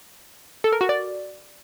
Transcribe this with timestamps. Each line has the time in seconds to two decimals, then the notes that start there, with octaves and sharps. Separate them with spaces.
0.64 A4
0.73 A#4
0.81 F#4
0.89 D5